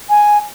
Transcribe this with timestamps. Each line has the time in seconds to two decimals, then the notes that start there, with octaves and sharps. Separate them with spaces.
0.10 G#5